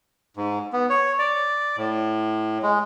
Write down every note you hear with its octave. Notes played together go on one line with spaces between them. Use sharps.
G#2
B3
C#5
D5
A2
G#3